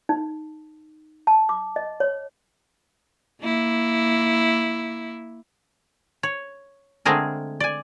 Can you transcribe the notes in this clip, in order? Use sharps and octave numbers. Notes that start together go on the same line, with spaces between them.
D#4
A5
D6
D#5
C#5
A#3 E4
C#5
D3 G#3 A3 C4 G#4 A#4
D5 G#5